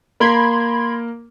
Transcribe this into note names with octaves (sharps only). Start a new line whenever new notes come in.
A#3 A#4 B5 C6 G#6